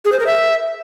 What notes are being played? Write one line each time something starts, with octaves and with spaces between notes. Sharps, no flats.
G#4
C5
A#4
E5